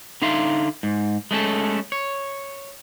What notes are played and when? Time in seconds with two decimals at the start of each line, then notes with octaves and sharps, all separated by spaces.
0.22 D3 D#4 E5 F5 C6
0.83 G#2
1.31 G#3 A3 C#4 A4
1.92 C#5